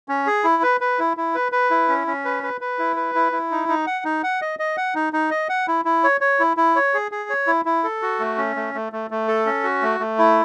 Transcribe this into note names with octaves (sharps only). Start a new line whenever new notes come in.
C#4
G#4
E4
B4
B4
E4
E4
B4
B4
E4
C#4
C#4
B4
B4
B4
E4
B4
E4
E4
D#4
D#4
F#5
D#4
F#5
D#5
D#5
F#5
D#4
D#4
D#5
F#5
E4
E4
C#5
C#5
E4
E4
C#5
G#4
G#4
C#5
E4
E4
A4
F#4
A3
C#4
A3
A3
A3
A3
A4
C#4
F#4
A3
A3
E4